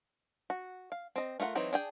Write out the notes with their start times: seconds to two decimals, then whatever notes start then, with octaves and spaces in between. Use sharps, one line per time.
0.50 F#4
0.92 F5
1.16 C4 D#5
1.40 A3 F4 A#4 F#5
1.55 E3 F#3 C4 D#4
1.73 D4 G#4 G5